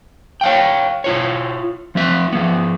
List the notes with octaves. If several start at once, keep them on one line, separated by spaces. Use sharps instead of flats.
C#5 F5 G5
E4 F4 C#5
F3 C4 E5
F3 B3